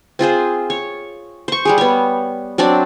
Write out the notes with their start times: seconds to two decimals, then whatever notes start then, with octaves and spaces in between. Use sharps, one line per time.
0.19 C4 F4 G#4 C5
0.70 C#5
1.48 C5 C#6
1.65 G3 G4 G#4
1.78 B3 C#5
2.58 F#3 C4 D4 D5